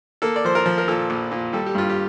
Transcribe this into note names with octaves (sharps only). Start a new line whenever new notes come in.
A#3 A4
D5
F3 C5
A#4
F3
A#4
A#2 A4
A#1
A#2
G3 A4
G4
G2 F4
G4